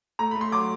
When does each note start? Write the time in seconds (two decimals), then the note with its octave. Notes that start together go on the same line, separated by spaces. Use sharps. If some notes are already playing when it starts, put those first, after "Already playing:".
0.19 A3 A#5
0.31 A3 B5
0.41 C6
0.52 F#3 D6